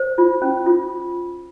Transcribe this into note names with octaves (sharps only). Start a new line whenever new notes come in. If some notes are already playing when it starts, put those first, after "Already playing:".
Already playing: C5
F4
C#4
F4